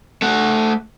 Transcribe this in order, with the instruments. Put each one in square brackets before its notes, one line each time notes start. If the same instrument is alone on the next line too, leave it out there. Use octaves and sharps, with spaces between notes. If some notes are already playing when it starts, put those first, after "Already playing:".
[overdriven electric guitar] A3 F#5